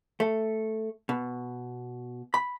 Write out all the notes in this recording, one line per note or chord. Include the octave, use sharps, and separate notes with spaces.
A3
B2
B5